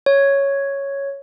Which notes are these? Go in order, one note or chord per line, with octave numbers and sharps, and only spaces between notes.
C#5